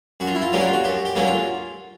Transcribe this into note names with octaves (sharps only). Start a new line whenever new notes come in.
F#2 F#4
F4
E4
F4
D3 F#3 A#3 C#4 G4
F#4
F4
F#4
F#2 G4
G4
D3 F#3 A#3 C#4
F4